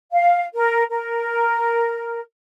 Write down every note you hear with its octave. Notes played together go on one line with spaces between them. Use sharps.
F5
A#4
A#4